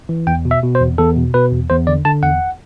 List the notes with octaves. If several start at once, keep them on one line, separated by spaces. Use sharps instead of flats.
E3
E2 G5
B2
E5
B2
C5
E2
E2 A4
B2
B2 B4
E2
E2 C5
D3 D5
D3 A5
E2 F#5